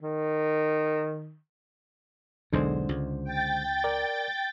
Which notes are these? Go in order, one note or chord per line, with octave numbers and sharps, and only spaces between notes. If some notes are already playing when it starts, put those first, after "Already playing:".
D#3
B1 E2 D3 G#3 C5
C#2
G5 A6
A#4 D5